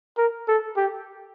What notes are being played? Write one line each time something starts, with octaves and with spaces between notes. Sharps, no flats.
A#4
A4
G4